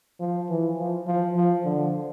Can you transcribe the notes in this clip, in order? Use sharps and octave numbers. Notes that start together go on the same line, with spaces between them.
F3
E3
F3
F3
F3
D3